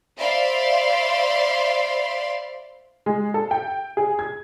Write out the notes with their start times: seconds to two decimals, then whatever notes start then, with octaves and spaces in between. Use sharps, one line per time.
0.18 C5 D5 E5 F5 B5 C6
3.06 G#3
3.34 A4
3.51 G5
3.97 G#4
4.19 G#6